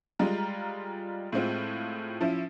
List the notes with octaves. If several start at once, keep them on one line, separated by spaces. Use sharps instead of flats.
G3 G#3 F4 A#5
A2 G#3 C4 F4
F3 C#4 E4